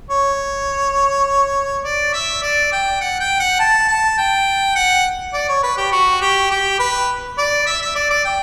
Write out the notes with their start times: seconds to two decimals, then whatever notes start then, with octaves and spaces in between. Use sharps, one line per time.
0.10 C#5
1.85 D5
2.14 E5
2.43 D5
2.72 G5
3.01 F#5
3.20 G5
3.40 F#5
3.60 A5
3.89 A5
4.18 G5
4.76 F#5
5.34 D5
5.49 C#5
5.63 B4
5.78 G4
5.92 F#4
6.21 G4
6.51 G4
6.80 B4
7.38 D5
7.67 E5
7.82 E5
7.96 D5
8.11 D5
8.25 G5